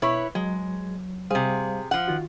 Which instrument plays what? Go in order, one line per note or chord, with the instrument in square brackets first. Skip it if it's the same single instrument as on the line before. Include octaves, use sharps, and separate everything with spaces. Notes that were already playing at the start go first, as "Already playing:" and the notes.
[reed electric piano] B2 [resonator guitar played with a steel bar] E4 B4 C#5
[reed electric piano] F#3 [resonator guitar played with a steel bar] G#3
[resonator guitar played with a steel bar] C3 G#4 [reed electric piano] G3 C5 F5
[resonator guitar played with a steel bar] F3 F#5
[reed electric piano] D#3 F4 F#4